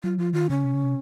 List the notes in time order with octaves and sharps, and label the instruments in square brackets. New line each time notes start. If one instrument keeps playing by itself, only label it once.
[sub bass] F#3 [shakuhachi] F4
[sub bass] F3 [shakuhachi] F4
[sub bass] D#3 [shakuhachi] F4
[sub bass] C#3 [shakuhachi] C#4
[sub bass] C3
C#3
C3